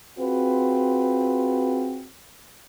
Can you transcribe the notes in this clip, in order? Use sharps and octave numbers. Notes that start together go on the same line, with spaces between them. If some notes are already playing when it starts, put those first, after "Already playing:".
C4 F4 F#4 G#4 B4